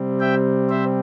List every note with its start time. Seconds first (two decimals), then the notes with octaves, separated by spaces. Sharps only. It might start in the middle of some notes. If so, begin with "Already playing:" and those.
Already playing: C3 G3 C4
0.20 E5 G5
0.69 C5 E5